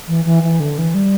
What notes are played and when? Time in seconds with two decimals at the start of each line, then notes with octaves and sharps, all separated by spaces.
0.08 E3
0.25 E3
0.43 E3
0.60 D3
0.78 E3
0.94 G3